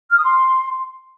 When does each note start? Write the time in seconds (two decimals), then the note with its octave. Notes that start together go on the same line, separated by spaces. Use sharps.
0.10 F6
0.17 D#6
0.24 C6